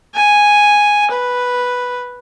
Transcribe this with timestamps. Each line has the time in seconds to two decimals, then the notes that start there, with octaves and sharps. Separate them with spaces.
0.14 G#5
1.11 B4